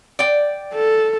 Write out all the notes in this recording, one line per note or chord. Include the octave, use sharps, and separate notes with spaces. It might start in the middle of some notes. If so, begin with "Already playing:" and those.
D5 G5
A4